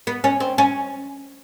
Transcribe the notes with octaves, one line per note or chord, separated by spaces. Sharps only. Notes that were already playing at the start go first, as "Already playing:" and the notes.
B3
C#4
C4
C#4